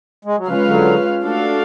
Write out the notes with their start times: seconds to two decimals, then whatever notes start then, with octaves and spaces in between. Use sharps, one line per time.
0.25 G#3
0.36 F#3
0.47 C#3 F3 G#3 C#4 F4 B4 F5
0.66 D3 F#3
1.23 A3 D4 F#4 A4 F5